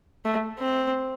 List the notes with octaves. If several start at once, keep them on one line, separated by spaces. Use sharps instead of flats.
A3
C4